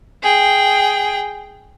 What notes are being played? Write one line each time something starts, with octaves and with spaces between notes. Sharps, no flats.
G#4 G5